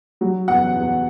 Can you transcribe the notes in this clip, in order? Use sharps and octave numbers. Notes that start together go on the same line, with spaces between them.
F#3
E2 F#5
E2